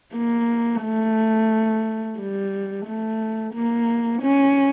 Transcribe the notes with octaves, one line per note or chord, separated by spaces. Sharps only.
A#3
A3
G3
A3
A#3
C#4